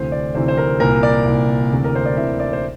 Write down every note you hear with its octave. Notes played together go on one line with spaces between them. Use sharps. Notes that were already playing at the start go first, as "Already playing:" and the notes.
Already playing: D2 C3 E3 C5
D5
D2 C3 E3 C5
C5
A#4
C2 A#2 A#4
D5
C2 A#2
D2 C3 E3
A#4
C5
D5
D2 C3 E3 E5
D5
C5